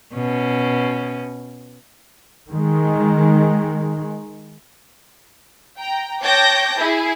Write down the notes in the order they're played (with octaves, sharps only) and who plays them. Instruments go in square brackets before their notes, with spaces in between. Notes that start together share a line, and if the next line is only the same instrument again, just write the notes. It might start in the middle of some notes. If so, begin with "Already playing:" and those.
[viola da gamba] B2 C#4
[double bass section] D#3 G#3
[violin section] G5 A#5
C#5 G5 A5 D6 G6 A#6
E4 G#4